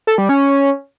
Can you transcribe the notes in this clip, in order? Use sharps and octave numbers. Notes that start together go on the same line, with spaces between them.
A4
G3
C#4